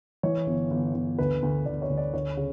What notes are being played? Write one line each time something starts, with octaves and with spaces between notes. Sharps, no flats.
E3 C#5
G1
G1
G1
D2 B4
D2
D2 D5
C#5
D2
D5
D2 C#5
C#3